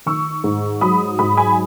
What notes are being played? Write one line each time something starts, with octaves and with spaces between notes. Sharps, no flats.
D#3 C#6 E6
G#2
F#3 B5 D#6
G#2 B5 D#6
G#5 B5